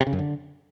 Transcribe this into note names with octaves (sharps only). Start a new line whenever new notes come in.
C3
C#3
F#2
D3